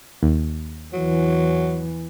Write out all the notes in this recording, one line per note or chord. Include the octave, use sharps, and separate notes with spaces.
D#2
E2 E3 F#3